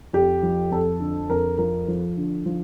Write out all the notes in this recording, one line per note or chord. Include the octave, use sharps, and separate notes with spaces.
F2 G4
F3
F2 A4
D3
F2 A#4
F3 A#4
F3
D3
F3